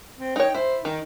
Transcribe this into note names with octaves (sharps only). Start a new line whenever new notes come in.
C4
D#4 C#5 G5
E4 C5
D#3 D#4